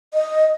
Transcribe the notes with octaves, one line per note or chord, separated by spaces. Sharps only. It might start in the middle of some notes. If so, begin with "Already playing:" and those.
D#5